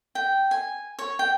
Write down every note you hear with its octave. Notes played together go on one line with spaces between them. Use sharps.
G5
G#5
C#5
G5